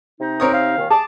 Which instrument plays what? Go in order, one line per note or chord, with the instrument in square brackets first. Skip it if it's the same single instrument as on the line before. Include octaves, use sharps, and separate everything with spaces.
[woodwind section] C3 D#4
[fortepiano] C4 C#5 D#6 [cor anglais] A#4
[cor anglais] F5
[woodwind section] D#2 A#2 D#3
[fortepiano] G#4 [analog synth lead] A5 [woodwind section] D6